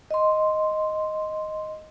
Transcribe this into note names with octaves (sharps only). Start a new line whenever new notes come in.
D#5 C6